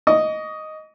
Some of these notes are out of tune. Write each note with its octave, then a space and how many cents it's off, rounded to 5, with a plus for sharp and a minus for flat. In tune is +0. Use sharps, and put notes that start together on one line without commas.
D#5 +0 C#6 +45